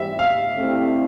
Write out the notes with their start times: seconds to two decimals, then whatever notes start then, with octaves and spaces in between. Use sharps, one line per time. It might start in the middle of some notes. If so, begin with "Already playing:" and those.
Already playing: E3 G3 C4 G4 E5
0.19 F5
0.57 D3 A3 C4 E4 G4